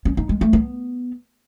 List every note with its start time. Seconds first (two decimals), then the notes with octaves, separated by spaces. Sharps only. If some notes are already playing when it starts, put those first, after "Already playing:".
0.05 C#4
0.17 D#4
0.29 G#3
0.41 A3
0.53 B3